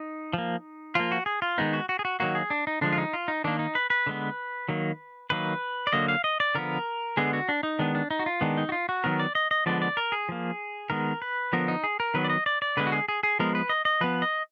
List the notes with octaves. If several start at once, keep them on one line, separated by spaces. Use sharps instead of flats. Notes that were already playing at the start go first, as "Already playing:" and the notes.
Already playing: D#4
F3 A#3
F3 A#3 F4
F#4
G#4
F4
D#3 G#3 B3 D#4
F#4
F#4
G#4
F#4
D#3 F#3 A#3 F#4
G#4
D4
D#4
D3 F3 G#3 D4
F4
D#4
F4
D#4
D#3 A#3 D4
D#4
B4
B4
D3 G#3 B3
D#3 F#3 A#3
D#3 F#3 A#3 B4
D5
D3 F#3 A#3 D#5
F5
D#5
D5
D3 F3 B3 A#4
D3 G#3 B3 G#4
F#4
D4
D#4
D#3 G#3 B3 D4
D4
D#4
F#4
F4
D#3 G#3 B3 D4
D#4
F#4
F4
F#4
D#3 F#3 B3 A#4
D5
D#5
D#5
D3 F3 G#3 B3 D5
D5
A#4
G#4
F3 A#3
D#3 G#3 B3 A#4
B4
D3 F3 B3 A#4
D#4
G#4
A#4
D#3 F#3 B3 B4
D5
D#5
D5
D5
D3 G#3 B3 B4
F#4
G#4
G#4
G#4
F3 G#3 B3 A#4
B4
D#5
D#5
F3 B3 B4
D#5